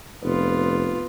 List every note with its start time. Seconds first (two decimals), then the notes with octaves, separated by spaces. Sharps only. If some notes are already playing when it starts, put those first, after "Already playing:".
0.23 F1 B3 F4